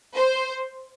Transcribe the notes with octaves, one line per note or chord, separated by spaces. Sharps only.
C5